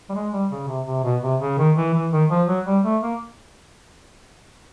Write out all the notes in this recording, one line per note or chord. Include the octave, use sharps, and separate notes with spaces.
G3
G#3
G3
C#3
C3
C3
B2
C3
C#3
D#3
E3
E3
D#3
F3
F#3
G3
A3
A#3